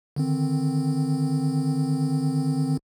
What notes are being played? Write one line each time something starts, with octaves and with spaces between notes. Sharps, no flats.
D3 D#3 C4